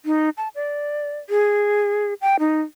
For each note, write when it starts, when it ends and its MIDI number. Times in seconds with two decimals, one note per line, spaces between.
0.05 0.29 63
0.37 0.48 81
0.55 1.19 74
1.29 2.14 68
2.21 2.36 79
2.39 2.61 63